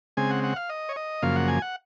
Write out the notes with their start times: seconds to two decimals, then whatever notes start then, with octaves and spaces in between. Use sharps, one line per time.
0.17 C#3 G#3 C4 G#5
0.30 F#5
0.44 F#5
0.56 F5
0.69 D#5
0.89 C#5
0.96 D#5
1.22 F#2 C#3 F3 A#3 F5
1.36 F#5
1.48 G#5
1.62 F#5